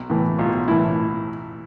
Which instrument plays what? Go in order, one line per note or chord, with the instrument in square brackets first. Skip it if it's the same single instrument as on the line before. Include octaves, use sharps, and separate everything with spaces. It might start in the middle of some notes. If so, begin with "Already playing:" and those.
Already playing: [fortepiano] B1
A2 E3
B1 F4
A2 E3 E4